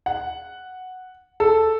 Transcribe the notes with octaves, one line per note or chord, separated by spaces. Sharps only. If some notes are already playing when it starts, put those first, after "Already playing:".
F#5
A4